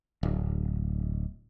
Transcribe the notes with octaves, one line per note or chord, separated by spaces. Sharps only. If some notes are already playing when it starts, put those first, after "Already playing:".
D1